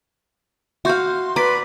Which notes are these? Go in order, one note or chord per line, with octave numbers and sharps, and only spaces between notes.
F#4 E5 F5 C6 C#6 G6
B4 D5 A#5 B6